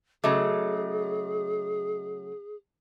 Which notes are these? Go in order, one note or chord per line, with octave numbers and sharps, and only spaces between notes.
C#3 F#3 A3 G#4 D#5 D6